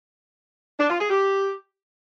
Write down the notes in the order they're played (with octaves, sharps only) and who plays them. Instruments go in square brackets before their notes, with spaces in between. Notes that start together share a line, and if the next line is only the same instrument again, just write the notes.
[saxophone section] D4
F4
G#4
G4